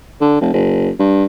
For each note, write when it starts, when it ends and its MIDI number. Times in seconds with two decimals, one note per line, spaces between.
0.21 0.38 50
0.41 0.50 29
0.53 0.90 30
0.99 1.25 43